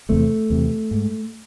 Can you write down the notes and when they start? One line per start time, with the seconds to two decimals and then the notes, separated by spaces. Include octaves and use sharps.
0.09 E2 C3 A3
0.50 E2 C3
0.91 G#2